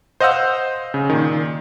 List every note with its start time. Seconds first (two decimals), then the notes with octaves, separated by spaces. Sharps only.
0.20 C5 D#5 F5 F#5 E6 G6
0.94 C#3
1.10 A#2 D#3